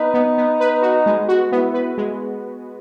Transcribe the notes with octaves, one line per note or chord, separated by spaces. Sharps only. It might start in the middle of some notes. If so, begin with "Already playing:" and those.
Already playing: B3 D#4 B4
B3
B3
B4
F#4
G#3
F#4
B3 E4
B4
G#3